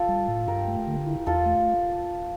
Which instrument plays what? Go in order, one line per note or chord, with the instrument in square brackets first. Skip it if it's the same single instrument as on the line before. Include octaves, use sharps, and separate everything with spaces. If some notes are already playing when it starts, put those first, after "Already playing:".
Already playing: [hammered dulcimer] F4 A4
[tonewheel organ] G3
A2
[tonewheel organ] G2 [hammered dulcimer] G4 A#4
[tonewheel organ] A3
D3
E4
[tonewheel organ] E2 [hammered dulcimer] F4 A4
[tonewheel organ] A3